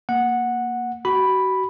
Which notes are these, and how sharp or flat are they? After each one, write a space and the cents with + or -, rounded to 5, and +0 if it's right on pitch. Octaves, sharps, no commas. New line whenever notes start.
A#3 +0 F#5 -10
F#4 +30 B5 +0